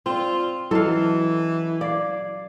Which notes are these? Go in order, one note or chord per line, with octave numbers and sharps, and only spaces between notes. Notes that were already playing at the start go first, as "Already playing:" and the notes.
C4 F4 D5 C6
E3 F#3 E4 F#4 A4 D#5 F5
D5 F5 G#6 C7